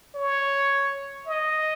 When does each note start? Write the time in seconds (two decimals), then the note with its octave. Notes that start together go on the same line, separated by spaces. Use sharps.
0.15 C#5
1.27 D#5